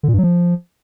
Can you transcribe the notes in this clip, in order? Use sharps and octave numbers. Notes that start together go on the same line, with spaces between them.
D3
A#2
G2
F#3
F3